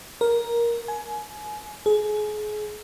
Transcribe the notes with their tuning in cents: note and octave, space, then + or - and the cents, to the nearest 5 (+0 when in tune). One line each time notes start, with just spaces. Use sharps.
A#4 +10
G#5 +25
G#4 +30